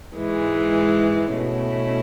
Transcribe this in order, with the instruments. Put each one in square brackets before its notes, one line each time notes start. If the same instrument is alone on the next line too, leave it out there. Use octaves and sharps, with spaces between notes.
[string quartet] G#2 E3 G#3
B2 A3 C#4 E4